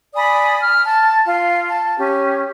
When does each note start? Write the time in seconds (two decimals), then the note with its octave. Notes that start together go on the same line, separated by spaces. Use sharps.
0.15 D5 G#5 B5 D#6
0.61 F6
0.84 A5
1.25 F4
1.68 A5
1.98 C#4 G4